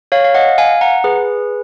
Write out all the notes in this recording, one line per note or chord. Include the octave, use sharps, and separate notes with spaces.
C#5 F5
F5
D#5 F#5
F5 G#5
F#5 A#5
G#4 B4